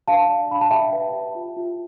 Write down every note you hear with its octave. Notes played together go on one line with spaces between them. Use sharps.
D4 F5 A5
D5
D4 B5
A5
G4 E5 G5
B4
G4
F4
F4